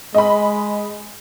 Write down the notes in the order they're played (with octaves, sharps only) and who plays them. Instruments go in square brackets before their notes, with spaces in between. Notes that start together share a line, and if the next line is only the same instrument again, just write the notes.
[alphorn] G#3 [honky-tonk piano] D#5 B5